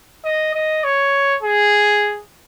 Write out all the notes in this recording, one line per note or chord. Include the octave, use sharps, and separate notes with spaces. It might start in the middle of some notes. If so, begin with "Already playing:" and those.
D#5
D#5
C#5
G#4